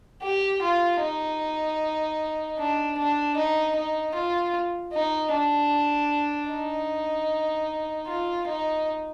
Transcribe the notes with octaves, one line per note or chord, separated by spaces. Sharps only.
G4
F4
D#4
D4
D4
D#4
D#4
F4
D#4
D4
D#4
F4
D#4